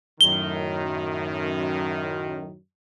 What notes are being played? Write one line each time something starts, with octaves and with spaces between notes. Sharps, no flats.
F#2 A2 D#3 G7